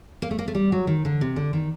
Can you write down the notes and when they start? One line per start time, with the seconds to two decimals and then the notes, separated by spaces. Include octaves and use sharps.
0.22 A#3
0.31 A3
0.39 A#3
0.48 A3
0.55 G3
0.72 F#3
0.87 D#3
1.05 D3
1.21 C3
1.36 D3
1.53 D#3